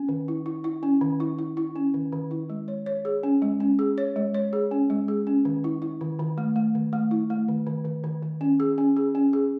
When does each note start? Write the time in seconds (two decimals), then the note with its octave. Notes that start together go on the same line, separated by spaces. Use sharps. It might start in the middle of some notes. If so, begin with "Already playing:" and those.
Already playing: C#4
0.09 D#3
0.28 E4
0.46 E4
0.64 E4
0.83 C#4
1.01 D#3
1.20 E4
1.39 E4
1.57 E4
1.76 C#4
1.94 D#3
2.12 D#3
2.31 E4
2.50 G#3
2.68 C#5
2.86 C#5
3.05 G#4
3.23 C#4
3.42 G#3
3.60 C#4
3.79 G#4
3.98 C#5
4.16 G#3
4.35 C#5
4.53 G#4
4.71 C#4
4.90 G#3
5.08 G#4
5.27 C#4
5.45 D#3
5.64 E4
5.82 E4
6.01 D#3
6.19 D#3
6.38 A3
6.56 A3
6.75 D#3
6.93 A3
7.11 E4
7.30 A3
7.48 D#3
7.67 D#3
7.85 D#3
8.04 D#3
8.23 D#3
8.41 C#4
8.60 G#4
8.78 C#4
8.96 G#4
9.15 C#4
9.33 G#4